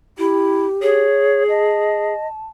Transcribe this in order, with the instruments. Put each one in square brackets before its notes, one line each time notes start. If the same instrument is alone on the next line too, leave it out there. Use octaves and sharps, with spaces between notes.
[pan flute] E4 [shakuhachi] G4
[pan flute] G#4 [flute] C#5
[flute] D#5 [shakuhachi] A5